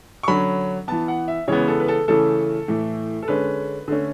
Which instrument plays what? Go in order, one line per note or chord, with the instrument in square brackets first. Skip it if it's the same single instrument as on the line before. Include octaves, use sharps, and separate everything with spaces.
[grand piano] C#6
D3 F#3 C#4 B5
E3 B3 A5
F#5
E5
C#3 E3 G#3 B3 C#5
A4
B4
A4
C#3 E3 A3 A4
A2 E3 A3
A4
D3 G#3 C#4 B4
D3 A3 C#4